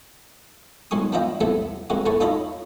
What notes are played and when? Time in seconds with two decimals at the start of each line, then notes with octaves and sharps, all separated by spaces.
0.91 G#2 B2 F#3 G#3 C#6 D#6
1.12 B3 D4 E4 F4 D#5 G5
1.41 C3 F#3 A3 B3 E4
1.90 G#3 C4 C#4 F#4 A#4 F#5
2.06 A2 A3 B3 G#5 A5 C#6
2.21 D#4 F4 A4 C#5 D#5 B5